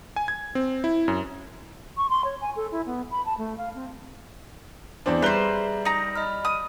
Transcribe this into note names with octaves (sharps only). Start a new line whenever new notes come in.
G#5
G#6
C4
E4
F#2
C#6
C6
C#5
G#5
A4
E4
B3
B5
A5
A3
F5
C4
E2 C4 D4
G3 G#4 B4 C5 E5 A#5 G7
D#4 A#5
D#5 B5 F6
D#6